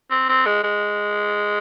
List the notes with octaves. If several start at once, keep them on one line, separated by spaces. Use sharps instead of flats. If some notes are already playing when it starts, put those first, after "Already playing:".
C4
C4
G#3
G#3